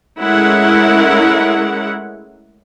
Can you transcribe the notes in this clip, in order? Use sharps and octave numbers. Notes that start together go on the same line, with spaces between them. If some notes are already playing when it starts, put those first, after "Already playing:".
G#3 A3 C#4 E4 A#4 F#5